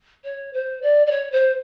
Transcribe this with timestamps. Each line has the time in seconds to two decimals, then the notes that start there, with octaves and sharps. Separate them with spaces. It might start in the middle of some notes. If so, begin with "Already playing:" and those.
0.24 C#5
0.53 C5
0.82 D5
1.06 D5
1.11 C#5
1.32 C5